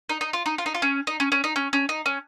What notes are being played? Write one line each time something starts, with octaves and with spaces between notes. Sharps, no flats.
D#4
D#4
F4
D#4
F4
D#4
F4
C#4
D#4
C#4
C#4
D#4
C#4
C#4
D#4
C#4